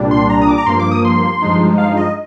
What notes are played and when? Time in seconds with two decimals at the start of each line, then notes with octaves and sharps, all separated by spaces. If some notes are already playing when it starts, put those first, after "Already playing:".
Already playing: C2 A#2 G3 D4
0.11 C6
0.30 A#5
0.41 D#6
0.48 D6
0.58 A#5
0.66 G2 F3 A#3 C6
0.79 D6
0.91 D#6
1.05 C6
1.42 G2 F3 G#3 D#4
1.78 F5
1.97 D#5